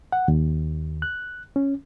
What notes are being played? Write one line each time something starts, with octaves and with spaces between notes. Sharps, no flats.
F#5
D#2
F#6
C#4